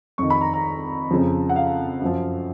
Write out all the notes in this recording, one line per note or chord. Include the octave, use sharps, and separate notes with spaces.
F2 D#3 C#6
B5
A#5
A#5
F2 C#3 F3
F#5
F5
F#2 F3